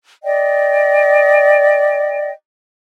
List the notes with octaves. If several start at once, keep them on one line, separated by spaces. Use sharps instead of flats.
D5 D#5 G5